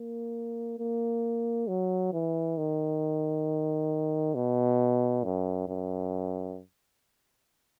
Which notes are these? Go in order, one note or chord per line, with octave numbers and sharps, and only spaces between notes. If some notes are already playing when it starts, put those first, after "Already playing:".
Already playing: A#3
A#3
F#3
E3
D#3
B2
F#2
F#2